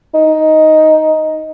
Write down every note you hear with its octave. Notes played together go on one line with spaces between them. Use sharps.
D#4